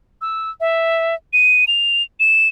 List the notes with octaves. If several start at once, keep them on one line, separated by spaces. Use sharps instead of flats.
E6
E5
D#7
F7
E7